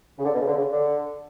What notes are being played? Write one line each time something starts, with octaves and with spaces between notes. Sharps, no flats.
C#3
D3
B2
C#3
D3
C#3
D3